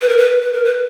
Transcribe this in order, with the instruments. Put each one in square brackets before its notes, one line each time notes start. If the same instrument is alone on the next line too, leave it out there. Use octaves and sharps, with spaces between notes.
[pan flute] B4
A#4
B4
B4
A#4
B4